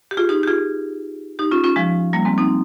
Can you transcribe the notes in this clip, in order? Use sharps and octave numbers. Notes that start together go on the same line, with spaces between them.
G4
F4 G#4
D#4 G4
G4
F4 G#4
D#4 G4
C#4 F4
C#4 F4
F3 G#3
G3 A#3
G#3 C4
C4 D#4